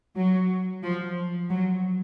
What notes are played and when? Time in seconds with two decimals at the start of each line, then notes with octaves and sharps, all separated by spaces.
0.15 F#3
0.82 F3
1.49 F#3